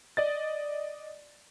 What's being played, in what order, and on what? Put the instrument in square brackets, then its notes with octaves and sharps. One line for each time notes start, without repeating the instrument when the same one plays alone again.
[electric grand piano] D5 D#5 A6